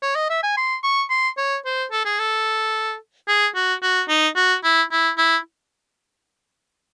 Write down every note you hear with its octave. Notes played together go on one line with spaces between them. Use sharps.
C#5
D#5
E5
G#5
C6
C#6
C6
C#5
C5
A4
G#4
A4
G#4
F#4
F#4
D#4
F#4
E4
E4
E4